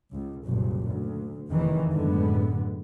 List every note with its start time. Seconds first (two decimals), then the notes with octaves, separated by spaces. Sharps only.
0.11 C#2
0.46 F#1 C2 A#2
0.88 D2
1.51 F1 E2 C3 D#3 E3
1.92 F#2 A2 D3 G#3 B3